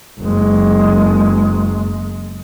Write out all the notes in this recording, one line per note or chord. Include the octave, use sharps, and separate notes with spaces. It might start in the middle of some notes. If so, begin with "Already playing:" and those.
F#1 G#3